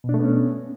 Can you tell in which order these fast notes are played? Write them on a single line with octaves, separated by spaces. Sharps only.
B2 D4 A3 B3 C#4